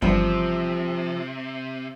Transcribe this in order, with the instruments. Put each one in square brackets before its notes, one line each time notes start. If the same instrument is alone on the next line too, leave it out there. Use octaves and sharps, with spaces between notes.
[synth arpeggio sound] G1 [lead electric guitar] C3 [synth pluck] E3 G3 B3 [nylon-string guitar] F3